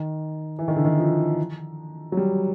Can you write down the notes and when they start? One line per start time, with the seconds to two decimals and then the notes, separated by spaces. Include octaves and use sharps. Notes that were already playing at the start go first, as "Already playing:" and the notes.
Already playing: D#3
0.59 E3
0.68 D#3
0.76 D3
0.85 D#3
0.99 F3
2.12 F#3
2.17 G3